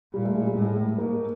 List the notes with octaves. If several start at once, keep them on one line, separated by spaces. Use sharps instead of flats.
A#2 G3
A3
G#3
G3
A2 G#3
A3
G#2 A#3